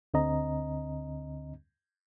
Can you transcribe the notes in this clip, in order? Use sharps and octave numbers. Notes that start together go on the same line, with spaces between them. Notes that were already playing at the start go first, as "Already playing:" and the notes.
D2 D3 C4 D#5 A#5